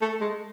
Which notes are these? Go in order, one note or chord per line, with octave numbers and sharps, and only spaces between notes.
A3
G#3